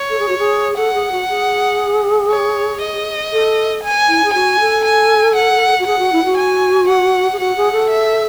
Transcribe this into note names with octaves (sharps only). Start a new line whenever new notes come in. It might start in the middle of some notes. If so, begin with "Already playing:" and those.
Already playing: C#5
A4
G#4
F#4
G#4
A4 F#5
G#4
F#4
G#4
C#5
D#5
A4
G#5
E4
G#4
F#4 G#5
A4
G#5
F#5
F#4
G#4 F#5
F#4
E4
F#4
G#5
F#5
G#4
F#4 F#5
G#4
A4
E5